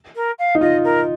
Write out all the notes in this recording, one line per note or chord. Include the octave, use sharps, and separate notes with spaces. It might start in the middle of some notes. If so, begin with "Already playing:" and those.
A#4
F5
D#4
F4 D#5
A#4